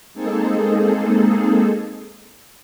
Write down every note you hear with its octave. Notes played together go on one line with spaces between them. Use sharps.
G#3 A#3 C4 D#4 G#4 A4